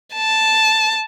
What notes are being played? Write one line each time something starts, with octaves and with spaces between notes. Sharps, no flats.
A5